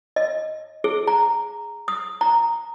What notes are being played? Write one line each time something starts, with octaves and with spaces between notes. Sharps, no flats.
D#5
G#4
A#5
D#6
A#5